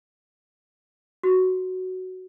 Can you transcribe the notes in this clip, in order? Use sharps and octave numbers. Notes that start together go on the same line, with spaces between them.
F#4